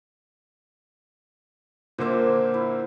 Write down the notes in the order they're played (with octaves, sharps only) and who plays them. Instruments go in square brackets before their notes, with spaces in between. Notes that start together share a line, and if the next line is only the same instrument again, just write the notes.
[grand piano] A#2 D3 A#3 [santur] C5 E5
[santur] E4